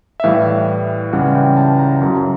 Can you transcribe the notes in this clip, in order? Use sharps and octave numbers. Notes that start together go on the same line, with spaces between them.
E5
A2 E3 G3 F5
C#2 C#3 E3 G3 F#5
G5
A5
A#5
F#2 C#3 F#3